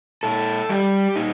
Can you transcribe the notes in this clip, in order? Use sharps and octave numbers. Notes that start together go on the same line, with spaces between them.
A#2 A4
G3 G4
A#2 D#4